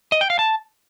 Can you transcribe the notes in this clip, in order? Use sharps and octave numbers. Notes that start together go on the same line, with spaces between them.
D#5
G5
F5
A5